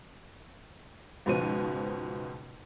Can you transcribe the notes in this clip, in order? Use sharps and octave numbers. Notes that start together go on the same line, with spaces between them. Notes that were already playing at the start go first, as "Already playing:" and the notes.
C#2 G#2 B2 F3 D#7